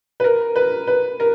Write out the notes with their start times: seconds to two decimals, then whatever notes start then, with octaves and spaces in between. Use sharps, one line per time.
0.20 B4
0.24 A#4
0.56 B4
0.87 B4
1.20 A#4